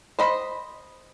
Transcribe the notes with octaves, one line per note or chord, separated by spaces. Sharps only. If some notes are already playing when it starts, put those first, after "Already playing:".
C5 D#5 B5